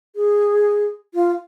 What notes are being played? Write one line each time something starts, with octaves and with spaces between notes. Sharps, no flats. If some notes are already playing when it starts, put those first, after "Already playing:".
G#4
F4